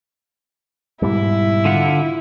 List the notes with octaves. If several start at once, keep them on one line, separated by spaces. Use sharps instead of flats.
G#2 B2 G3 E4
D3 F4 F#5